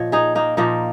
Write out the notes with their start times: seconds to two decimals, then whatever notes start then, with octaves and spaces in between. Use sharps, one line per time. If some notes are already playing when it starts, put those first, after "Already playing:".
Already playing: A#2 F3 C#5 D#5
0.12 D#4 G#4
0.35 A#3 D#4
0.57 A#2 F3 A#3 D#4